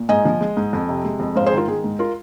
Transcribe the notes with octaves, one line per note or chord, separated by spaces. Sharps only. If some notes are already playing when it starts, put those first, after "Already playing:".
Already playing: A#2
G#2 D#5 G#5
F3
G#3
G#2
F2
C3
G#3
F2
G#2 C5 F5
G#4 C5
D#3
F4 A#4
G#3 G#4
G#2
F4 A#4